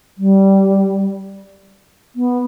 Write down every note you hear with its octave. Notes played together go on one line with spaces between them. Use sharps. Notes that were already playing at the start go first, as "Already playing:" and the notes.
G3
B3